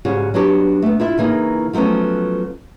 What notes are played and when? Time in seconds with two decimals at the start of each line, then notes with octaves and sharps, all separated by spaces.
0.05 G#2 C#3 G3 F#4
0.34 F#3 B3 D4 F#4 G4
0.82 A3 B3
1.00 E4 F4 E5
1.18 C#3 E3 A#3 D#4
1.73 F3 F#3 A3 B3 C#4